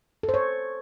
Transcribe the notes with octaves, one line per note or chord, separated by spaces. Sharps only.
A4
C5
C#5